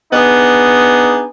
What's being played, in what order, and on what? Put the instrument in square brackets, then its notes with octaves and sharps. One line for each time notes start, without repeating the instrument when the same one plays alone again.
[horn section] B3 D4 D#4 G#4